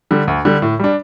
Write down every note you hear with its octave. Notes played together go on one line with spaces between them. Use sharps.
D3 G3
D2
D3 G3
A2
G3 D4